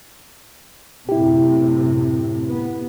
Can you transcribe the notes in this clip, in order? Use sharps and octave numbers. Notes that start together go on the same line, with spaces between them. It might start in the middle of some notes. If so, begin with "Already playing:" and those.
F#2 A2 C3 E4 G4
B3